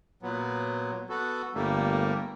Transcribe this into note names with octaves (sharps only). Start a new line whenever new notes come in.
A#2 F#3 B3
B3 F#4 A4
G1 G3 A3 A#3